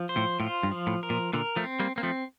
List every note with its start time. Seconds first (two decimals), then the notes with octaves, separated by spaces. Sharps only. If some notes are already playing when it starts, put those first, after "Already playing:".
Already playing: F3
0.09 C5
0.17 A2
0.40 A2 F4
0.63 G2
0.71 F3
0.87 A2
1.03 A#4
1.10 A#2
1.33 A#2 D3 A#4
1.56 F3 A3
1.64 C4
1.80 G3 A#3
1.96 A#3 C4
2.03 F3 A3